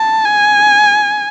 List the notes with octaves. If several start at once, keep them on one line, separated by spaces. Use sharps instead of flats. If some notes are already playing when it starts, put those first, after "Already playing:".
Already playing: A5
G#5